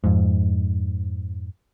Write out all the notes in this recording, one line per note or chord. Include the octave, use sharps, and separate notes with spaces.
F2 G#2